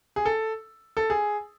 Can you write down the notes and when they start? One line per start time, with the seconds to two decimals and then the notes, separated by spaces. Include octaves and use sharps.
0.16 G#4
0.26 A4
0.97 A4
1.10 G#4